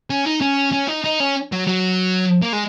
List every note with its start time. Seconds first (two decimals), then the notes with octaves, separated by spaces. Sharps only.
0.10 C#4
0.25 D#4
0.42 C#4
0.73 C#4
0.88 D#4
1.04 D#4
1.20 C#4
1.52 F#3
1.67 F#3
2.42 A#3
2.53 G#3